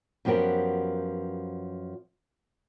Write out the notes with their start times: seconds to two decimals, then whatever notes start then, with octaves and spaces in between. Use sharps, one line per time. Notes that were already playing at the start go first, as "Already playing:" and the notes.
0.25 F#2 F3 B3 G4 A#4